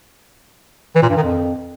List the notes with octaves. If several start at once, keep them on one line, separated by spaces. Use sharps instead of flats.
E3
A#2
G2
D#3
F2